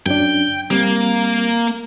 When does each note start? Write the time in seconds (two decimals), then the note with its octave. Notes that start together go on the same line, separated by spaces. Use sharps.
0.06 F#2 C#4 D4 G5
0.71 G3 A#3 C4